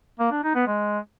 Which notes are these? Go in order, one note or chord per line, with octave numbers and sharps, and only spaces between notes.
A#3
D4
D#4
B3
G#3